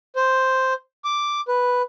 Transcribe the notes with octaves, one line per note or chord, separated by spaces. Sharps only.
C5
D6
B4